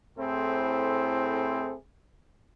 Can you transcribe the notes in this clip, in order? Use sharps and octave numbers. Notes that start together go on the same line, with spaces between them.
A2 C4 E4 G#4 A4 C5